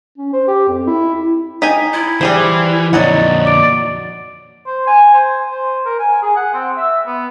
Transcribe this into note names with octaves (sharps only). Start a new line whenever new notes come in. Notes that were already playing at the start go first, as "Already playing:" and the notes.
C#4
C5
G4
F2
E4
D#4 G5 G#5 B6
E4
E3 G3 G#4 C5
F2 A#2 F#3 D#4 D5 D#5 F#5
D6 D7
C5
G#5
C5
C5
A#4
G#5
G#4
F#5
C4
E5
B3